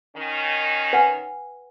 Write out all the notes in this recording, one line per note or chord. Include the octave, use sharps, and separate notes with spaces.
D#3 C#4
B4 F#5 G#5